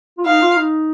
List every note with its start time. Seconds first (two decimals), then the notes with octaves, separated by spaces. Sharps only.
0.18 F4
0.26 D#4 F5
0.42 F4
0.57 D#4